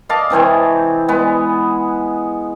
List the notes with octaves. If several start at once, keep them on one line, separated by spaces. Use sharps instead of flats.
D#5 F5 A5 D6
C3 E3 C4 C#5
G#3 B3